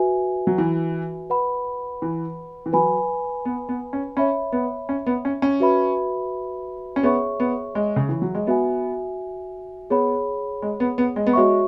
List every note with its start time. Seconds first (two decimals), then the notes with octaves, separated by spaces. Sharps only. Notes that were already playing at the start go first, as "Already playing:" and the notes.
Already playing: F#4 B4 E5 G#5
0.47 F#3
0.58 E3
1.30 B4 F#5 B5
2.02 E3
2.66 E3
2.73 F#3 B4 G#5 B5
3.45 B3
3.69 B3
3.93 C#4
4.17 C#4 C#5 E5 B5
4.52 B3
4.89 C#4
5.06 B3
5.25 C#4
5.42 C#4
5.60 F#4 B4 E5 B5
6.96 C#4
7.03 B3 G#4 C#5 E5 C#6
7.40 B3
7.75 G#3
7.96 C#3
8.09 E3
8.22 F#3
8.35 G#3
8.47 B3 F#4 E5 G#5
9.90 B3 G#4 C#5 F#5 B5
10.62 G#3
10.80 B3
10.98 B3
11.16 G#3
11.27 B3
11.33 G#3 F#4 C#5 E5 C#6